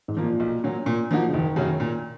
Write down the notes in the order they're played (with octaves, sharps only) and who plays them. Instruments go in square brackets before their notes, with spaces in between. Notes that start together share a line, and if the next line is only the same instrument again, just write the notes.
[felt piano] G#2
[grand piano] F3 A#3 F4
[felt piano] A#2
[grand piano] B1
A#2 F#3
A#2
F3 A#3 D#4 F#4
[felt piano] C#3
[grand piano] F#1 [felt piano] D#3
[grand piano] F#2 C#3 F#3
A#2